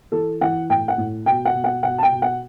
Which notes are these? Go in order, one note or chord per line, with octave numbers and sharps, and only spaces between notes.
E3 A4
E3 F#5
A2 G5
F#5
A2
B2 G5
F#5
B2
F#5
B2 F#5
A5
G5
B2
F#5